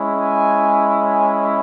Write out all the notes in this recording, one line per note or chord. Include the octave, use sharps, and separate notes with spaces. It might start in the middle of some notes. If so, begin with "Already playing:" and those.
Already playing: G#3 C#4 E4
G#5
G#5